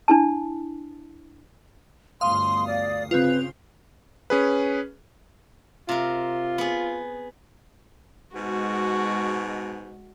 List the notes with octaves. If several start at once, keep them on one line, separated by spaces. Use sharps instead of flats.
D4 E4 A5
G1 D2 F5 C6 D#6
D5
C#3 C4 F4 B4
C#4 G#4 B4
C3 F4 A#4
B3 G#4
G#2 B2 G#3 F#4